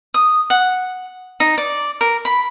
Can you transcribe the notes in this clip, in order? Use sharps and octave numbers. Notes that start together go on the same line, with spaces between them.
D#6
F#5
D#4
D5
A#4
B5